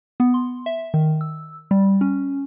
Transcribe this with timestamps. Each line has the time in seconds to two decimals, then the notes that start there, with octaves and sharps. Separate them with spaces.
0.20 B3
0.34 C6
0.66 E5
0.94 D#3
1.21 E6
1.71 G3
2.01 C#4